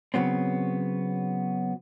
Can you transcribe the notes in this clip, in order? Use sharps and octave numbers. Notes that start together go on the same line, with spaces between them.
C#3 F#3 B3 C4